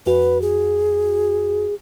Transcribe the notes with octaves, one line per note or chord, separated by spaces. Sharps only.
F2 F#4 B4
G#4